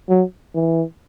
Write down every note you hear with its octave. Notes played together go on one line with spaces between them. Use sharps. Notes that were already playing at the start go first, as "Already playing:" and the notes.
F#3
E3